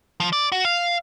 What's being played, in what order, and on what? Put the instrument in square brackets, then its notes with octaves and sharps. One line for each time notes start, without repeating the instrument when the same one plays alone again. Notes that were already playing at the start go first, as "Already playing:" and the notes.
[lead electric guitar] F3
D5
F#4
F5